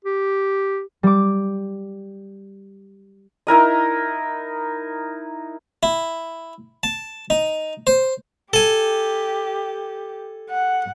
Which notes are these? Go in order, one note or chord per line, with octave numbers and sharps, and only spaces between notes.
G4
G3 D6
D#4 E4 A#4 D#5
E4
A5
D#4
C5
G4 A4 G#5
F#5